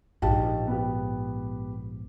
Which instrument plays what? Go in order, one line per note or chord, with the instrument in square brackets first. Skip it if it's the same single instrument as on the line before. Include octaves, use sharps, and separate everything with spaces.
[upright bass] A#1 G#2 [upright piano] D#4 G4 A5
[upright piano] B3 G4